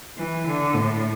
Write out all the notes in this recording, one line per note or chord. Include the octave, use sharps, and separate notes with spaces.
E3
D3
A2